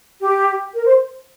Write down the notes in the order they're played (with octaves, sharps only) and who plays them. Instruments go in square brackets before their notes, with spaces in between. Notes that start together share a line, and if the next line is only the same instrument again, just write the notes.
[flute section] G4
A#4
C5